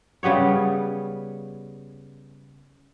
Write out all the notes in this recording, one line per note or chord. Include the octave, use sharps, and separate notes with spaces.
C#3 G3 B3 C#5